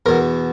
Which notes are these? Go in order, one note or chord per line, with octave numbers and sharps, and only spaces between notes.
E2 B2 A#4